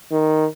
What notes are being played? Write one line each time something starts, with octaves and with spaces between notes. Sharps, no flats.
D#3